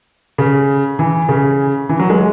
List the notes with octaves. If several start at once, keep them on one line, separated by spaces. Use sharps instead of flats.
C#3
E3
C#3
E3
F#3
G#3